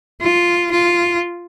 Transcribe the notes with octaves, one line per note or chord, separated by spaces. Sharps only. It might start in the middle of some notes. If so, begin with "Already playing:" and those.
F4
F4